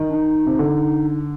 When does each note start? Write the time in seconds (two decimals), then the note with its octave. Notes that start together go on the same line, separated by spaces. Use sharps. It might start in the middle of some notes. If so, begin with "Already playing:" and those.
Already playing: D#3
0.09 D4
0.15 D#4
0.46 C3
0.59 D3